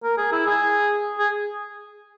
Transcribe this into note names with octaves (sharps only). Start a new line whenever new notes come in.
A#4
G#4
E4
G#4
G#4